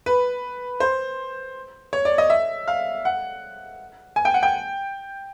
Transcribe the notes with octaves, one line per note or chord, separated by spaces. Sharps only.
B4
C5
C#5
D5
D#5
E5
F5
F#5
G#5
G5
F#5
G5